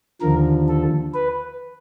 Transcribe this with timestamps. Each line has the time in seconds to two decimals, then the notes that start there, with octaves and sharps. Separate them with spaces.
0.21 D#2 D3 F3 A#4
0.68 A4
1.14 B4